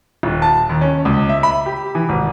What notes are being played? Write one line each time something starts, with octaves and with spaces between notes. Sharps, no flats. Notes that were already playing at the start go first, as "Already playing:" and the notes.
D#1
A5
D#2
C#4
C#2
E5
B5
G4
E3
G#1